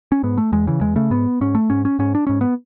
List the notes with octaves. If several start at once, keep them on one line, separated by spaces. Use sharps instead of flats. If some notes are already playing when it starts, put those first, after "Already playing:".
C#4
G#2 B3
A3
E2 G#3
C#3 E3
E2 G#3
C#3 A3
G#2 B3
G#2 C#4
A3
G#2 C#4
C#4
G#2 C#4
D4
G#2 C#4
B3